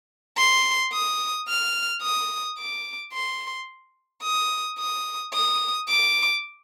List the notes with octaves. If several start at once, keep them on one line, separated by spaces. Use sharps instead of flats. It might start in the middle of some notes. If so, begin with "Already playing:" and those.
C6
D#6
F6
D#6
D6
C6
D#6
D#6
D#6
D6